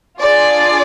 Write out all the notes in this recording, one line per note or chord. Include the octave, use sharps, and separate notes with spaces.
D4 F4 G#4 D5